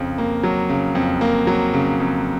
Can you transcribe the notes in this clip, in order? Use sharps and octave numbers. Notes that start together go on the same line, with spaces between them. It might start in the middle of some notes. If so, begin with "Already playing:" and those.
Already playing: F2 C#3
A#3
F#3
C#3
F2
A#3
F#3
C#3
F2